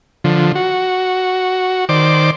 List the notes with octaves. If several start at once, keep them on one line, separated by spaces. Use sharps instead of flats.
D3 F3
F#4
D#3 C5 D5 D6